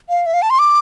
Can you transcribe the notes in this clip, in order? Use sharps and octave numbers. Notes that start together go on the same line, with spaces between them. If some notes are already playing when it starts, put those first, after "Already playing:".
F5
E5
F5
A5
C6
D6